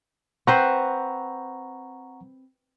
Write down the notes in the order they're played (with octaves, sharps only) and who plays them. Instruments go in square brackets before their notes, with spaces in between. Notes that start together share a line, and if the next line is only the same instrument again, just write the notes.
[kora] C4 B4 C5 [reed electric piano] F#5 A#5 C#6